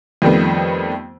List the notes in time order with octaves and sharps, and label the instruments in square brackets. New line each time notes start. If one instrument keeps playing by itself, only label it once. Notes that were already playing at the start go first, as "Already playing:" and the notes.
[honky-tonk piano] F2 D#3 G3 A3 B3